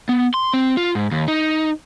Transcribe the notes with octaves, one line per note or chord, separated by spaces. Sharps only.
B3
C6
C4
F4
G#2
D#2
D#4